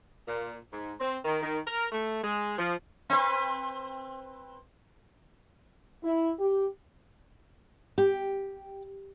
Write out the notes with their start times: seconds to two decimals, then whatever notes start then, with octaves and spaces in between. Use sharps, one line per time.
0.27 A#2
0.72 G#2
1.00 C4
1.25 D#3
1.42 D#3
1.67 A#4
1.92 A3
2.23 G#3
2.59 F3
3.10 C4 B4
6.03 E4
6.39 G4
7.98 G4